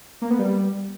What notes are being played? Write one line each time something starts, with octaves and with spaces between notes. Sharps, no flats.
A#3
B3
G3